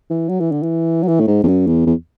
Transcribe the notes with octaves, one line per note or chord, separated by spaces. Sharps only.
E3
F#3
E3
D3
E3
F#3
E3
A2
G#2
E2
F#2
E2
E2